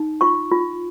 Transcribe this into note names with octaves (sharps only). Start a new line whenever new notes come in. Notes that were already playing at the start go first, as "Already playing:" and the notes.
Already playing: D#4
F4 C#6
F4